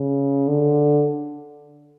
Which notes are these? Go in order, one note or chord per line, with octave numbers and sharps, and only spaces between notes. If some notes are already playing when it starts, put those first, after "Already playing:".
Already playing: C#3
D3